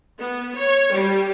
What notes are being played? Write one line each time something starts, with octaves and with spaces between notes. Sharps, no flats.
B3
C#5
G3